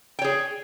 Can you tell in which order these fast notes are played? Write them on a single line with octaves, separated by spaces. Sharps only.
G5 C#5 G#4